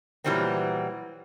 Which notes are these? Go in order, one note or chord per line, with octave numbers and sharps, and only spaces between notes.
A#2 E3 F#3 G3 B3 C4